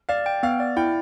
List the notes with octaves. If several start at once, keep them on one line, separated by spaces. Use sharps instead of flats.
D5 F5
G5
B3 F5
D5
E4 G5